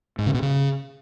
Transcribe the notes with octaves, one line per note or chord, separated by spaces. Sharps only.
G#2
C#3
B2
C#3